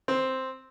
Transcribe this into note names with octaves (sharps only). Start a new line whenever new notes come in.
C4